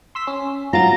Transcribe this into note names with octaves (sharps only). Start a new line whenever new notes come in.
C6 E6 B6
C#4
G#2 F#3 F4 A#5 A6